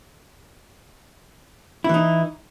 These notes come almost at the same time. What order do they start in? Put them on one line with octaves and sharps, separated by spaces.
E4 E3 D#4